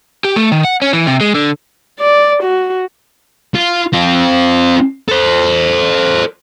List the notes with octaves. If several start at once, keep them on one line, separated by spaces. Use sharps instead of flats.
G4
A3
D#3
F#5
C#4
E3
C3
G#3
D3
D5
F#4
F4
C4 F4
A4 C5